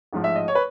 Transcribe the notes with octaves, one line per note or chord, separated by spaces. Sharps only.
A1 G#2 F3
E5
D#5
C#5
B4